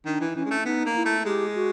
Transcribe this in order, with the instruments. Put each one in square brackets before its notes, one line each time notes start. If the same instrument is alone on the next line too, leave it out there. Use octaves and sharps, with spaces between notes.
[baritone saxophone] D#3 [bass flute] D4
[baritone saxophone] E3
[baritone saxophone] E3 [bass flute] C#4
[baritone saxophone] G#3
A3
[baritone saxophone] B3 [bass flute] D#4
[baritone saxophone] A#3
[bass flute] E4
[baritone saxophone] A3
[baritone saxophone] G#3 [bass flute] G4
[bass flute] F#4